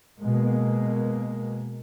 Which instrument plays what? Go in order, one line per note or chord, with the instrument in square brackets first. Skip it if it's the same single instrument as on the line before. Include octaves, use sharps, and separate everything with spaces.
[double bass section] B2 G#3 A#3